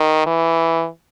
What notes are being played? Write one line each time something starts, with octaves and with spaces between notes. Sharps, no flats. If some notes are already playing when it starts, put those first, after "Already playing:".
Already playing: D#3
E3